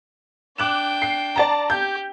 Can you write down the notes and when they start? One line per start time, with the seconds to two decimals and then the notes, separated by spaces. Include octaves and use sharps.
0.58 D4 G5 D6 F#6 E7
1.02 C7
1.36 D5 A5 A#5
1.70 G4 G6